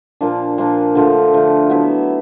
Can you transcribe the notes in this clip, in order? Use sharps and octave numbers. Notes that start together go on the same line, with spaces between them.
A#2 F3 A#3 D4
A#2 F3 A#3 D4
D3 F3 A3
D3 F3 A3
F#3 B3 E4